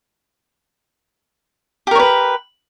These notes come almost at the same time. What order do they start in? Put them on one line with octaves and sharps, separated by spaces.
G4 A#4 C#5 B4